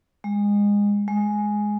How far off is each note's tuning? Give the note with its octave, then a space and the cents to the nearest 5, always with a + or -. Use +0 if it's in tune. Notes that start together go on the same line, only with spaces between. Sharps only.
G#3 -25
G#3 +5